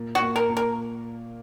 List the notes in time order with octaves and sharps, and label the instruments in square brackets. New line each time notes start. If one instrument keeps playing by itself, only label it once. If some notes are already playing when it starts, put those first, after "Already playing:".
Already playing: [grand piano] A#2
[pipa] F#4
[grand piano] A#3
[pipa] A#4
[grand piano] A#2
[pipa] A#4